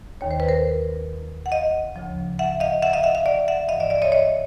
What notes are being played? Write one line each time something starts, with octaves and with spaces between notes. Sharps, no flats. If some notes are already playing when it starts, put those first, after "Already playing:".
D#2 D#3 C#5
C5
B4
A#4 C5
F#5
D#5 F5
D2 C#3 F3
E5 F#5
D#5 F5
E5 F#5
D#5 F5
E5 F#5
D#5 F5
D5 E5
E5 F#5
G2 E3 D#5 F5
D5 E5
D5 E5
C#5 D#5
C#5 D#5